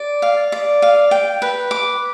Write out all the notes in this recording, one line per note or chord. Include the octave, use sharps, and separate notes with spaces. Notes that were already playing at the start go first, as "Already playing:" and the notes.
Already playing: D5
F5
D5
F5
G5
B4
D6